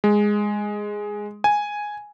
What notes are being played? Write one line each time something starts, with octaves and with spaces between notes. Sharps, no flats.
G#3
G#5